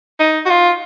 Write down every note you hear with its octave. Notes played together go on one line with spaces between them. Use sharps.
D#4
F#4
F4